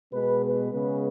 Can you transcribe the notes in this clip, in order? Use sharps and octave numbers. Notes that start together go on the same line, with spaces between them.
B2 G#3 B3 B4
B4
C#3 G#3 B3 B4